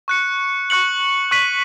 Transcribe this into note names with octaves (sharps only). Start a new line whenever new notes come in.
C#6 F#6 C#7
C#6 F#6 C#7 F#7
C#6 F#6 B6 D#7 F#7